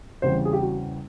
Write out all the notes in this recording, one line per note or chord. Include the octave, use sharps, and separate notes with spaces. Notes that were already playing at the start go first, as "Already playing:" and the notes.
E2 C#3 E3 G3 C4 C5
G#4
G4
F#4